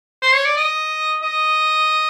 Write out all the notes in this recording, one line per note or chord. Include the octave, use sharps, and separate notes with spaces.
C5
C#5
D5
D#5
D#5